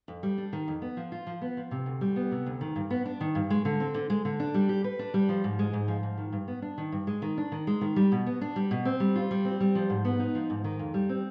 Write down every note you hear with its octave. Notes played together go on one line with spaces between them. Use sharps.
F2
G3
D4
D#3
F2
B3
F3
F4
F3
B3
F3
C3
D2
G3
B3
C3
D2
D#3
G2
B3
D4
D#3
G2
G#3
D3
C4
D3
G#3
D3
D4
G3
G4
B4
D4
G3
F3
G#2
G#3
G#2
F3
G#2
D#3
G2
B3
D4
D#3
G2
G#3
D#3
D4
D#3
G#3
D#3
G3
B2
B3
D4
G3
B2
C4
G3
F4
G3
C4
G3
F3
G#2
B3
D#4
F3
G#2
D#3
F2
G3
C4